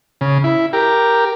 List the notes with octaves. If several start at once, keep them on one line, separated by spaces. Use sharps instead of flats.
C#3
E4
G4 A#4